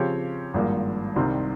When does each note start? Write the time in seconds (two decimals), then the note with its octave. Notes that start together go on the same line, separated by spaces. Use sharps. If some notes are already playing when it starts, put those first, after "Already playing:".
Already playing: C#3 F3 C4 G4 C#5
0.54 G#1 G2 F3 A#3
1.16 C2 C3 D#3 G3 C4